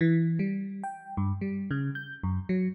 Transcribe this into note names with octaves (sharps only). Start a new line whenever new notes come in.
E3
G3
G5
G2
G3
C#3
G6
F#2
F#3